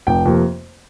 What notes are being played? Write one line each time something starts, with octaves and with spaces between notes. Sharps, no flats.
F1 G5
F2 C3 A#3